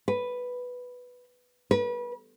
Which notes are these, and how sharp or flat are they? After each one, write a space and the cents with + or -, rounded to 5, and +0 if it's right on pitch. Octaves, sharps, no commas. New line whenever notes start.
B4 +0
B4 -30